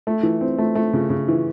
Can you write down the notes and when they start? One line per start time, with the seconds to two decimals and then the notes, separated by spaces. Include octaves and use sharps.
0.07 A3
0.23 E3
0.41 C4
0.58 A3
0.75 A3
0.93 C#3
1.10 C#3
1.28 E3